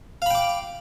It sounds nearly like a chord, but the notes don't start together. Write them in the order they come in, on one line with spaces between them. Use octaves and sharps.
F5 B5 G5 D6